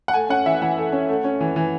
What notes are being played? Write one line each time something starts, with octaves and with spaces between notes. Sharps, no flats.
F#5
A3 G#5
C#4 F#5
E3 E5
E3 F#5
A3
C#4
A3
C#4
E3
E3